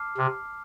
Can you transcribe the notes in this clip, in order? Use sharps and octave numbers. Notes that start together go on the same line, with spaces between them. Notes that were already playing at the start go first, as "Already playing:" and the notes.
Already playing: A5 D6 F6 C7
C3